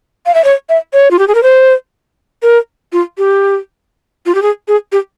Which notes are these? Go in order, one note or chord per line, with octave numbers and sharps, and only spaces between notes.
F5
E5
C#5
E5
C#5
F4
G4
G#4
A#4
C5
A#4
F4
G4
F4
G4
G#4
G#4
G4